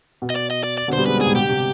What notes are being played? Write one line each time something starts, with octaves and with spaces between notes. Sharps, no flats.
B2
D#5
D5
D#5
D5
D5
B2 D3
G3 B3 C5
G#3 C4 B4
G3 B3
G#2 C3 G#4
B2 D3 G4
C3